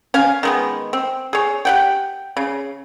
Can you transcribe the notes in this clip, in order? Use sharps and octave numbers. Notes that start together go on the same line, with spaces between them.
C#4 F5 G#5
D#3 G#3 B3
C4
G#4 C#5
G4 F#5 G5
C#3